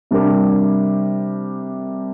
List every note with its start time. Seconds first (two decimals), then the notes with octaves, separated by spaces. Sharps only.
0.11 C3 G3 D4 G4 A#4